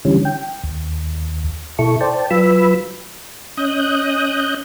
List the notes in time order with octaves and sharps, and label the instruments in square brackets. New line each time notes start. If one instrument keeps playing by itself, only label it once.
[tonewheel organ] D3 E3 G3 C#4
G5
D#2
B2 E4 A4 C#6
C5 D5 G5 A5
F#3 F4 B4 B5 E6
C#4 D#5 D#6 F#6 G6